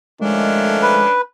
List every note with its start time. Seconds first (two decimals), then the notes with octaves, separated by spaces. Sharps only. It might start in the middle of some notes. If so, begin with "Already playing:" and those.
0.21 D#3 F3 G#3 A3 C#4 D4
0.82 B4